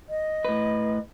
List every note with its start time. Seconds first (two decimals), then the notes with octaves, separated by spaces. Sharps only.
0.09 D#5
0.45 A2 B4